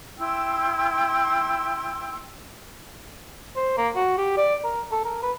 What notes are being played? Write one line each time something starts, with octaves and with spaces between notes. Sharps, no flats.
E4 G5 C6 E6
C5
A#3
F#4
G4
D5
A#4
A4
A#4
B4